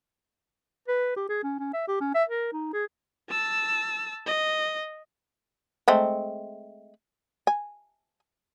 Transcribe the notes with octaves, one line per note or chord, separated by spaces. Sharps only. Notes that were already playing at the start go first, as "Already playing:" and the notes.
B4
G4
G#4
C#4
C#4
E5
G4
C#4
E5
A#4
D#4
G#4
A5 E6
D#5
G#3 A3 C4
G#5